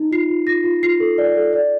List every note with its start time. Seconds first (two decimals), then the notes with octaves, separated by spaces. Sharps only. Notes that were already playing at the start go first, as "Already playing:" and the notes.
Already playing: D#4
0.11 F4 C7
0.29 F4
0.47 F4 A#6
0.64 F4
0.83 F4 C7
1.00 A4
1.18 D5
1.35 A4
1.53 D5